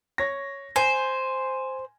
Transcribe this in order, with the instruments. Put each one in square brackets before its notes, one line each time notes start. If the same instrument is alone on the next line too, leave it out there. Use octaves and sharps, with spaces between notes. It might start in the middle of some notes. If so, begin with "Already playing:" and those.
[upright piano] C#5 A#6
[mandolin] C5 [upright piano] G#5